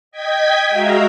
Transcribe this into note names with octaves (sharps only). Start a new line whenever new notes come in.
D#5 G5 G#6 B6
G#3 F#4 E5 F5 A#5